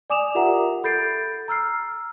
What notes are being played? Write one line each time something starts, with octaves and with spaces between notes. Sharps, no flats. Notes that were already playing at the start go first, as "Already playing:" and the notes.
D5 G#5 D6 D#6 E7 F7
F4 G4 A#4 E5 F#5 A#5
A4 B5 G6 A6 C7 D7
A#5 E6 F6 C7